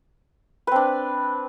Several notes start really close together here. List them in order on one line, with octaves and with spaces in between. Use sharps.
B4 C4 D4